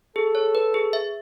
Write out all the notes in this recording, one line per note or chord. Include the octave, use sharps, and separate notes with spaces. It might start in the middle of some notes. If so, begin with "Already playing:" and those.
G#4 A4
C#5
B4
G#4
E5